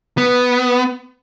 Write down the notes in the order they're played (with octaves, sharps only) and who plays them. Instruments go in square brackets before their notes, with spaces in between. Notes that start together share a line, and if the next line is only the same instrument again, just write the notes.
[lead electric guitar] B3